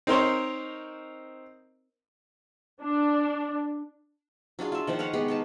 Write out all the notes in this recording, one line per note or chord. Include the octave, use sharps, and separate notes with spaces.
C4 D#4 A#4 C5 C#5
D4
F#3 D4 F4 G#4
F4 E5
D#3 F3 C5 F#5
B4 C#5 F5 F#5
G#3 B3 G4
D#4 B4 A5